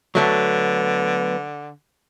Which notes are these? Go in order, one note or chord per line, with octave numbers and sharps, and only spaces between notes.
D3 F#3 A3 B3